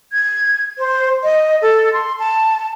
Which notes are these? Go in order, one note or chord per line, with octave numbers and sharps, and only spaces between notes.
G#6
C5
D#5
A4
C6
A5